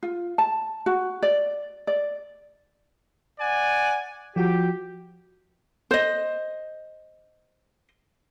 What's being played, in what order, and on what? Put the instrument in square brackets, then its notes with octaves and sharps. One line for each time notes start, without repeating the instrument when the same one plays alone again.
[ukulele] F4
A5
F#4
D5
D5
[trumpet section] D5 F#5 G#5
[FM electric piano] F3 F#4 [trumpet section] G4
[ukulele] C5 D#5